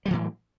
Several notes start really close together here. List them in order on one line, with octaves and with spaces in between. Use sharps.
G3 F#3 E3 A2